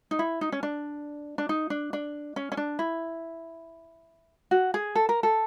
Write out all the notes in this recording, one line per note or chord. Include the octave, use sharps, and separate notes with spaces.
D#4
E4
D#4
C#4
D4
D4
D#4
D4
D4
C#4
C#4
D4
E4
F#4
G#4
A4
A#4
A4